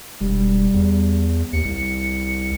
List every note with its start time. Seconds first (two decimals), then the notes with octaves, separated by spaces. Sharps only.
0.21 E1 G3
0.74 E2
1.53 D#2 C#7
1.65 C2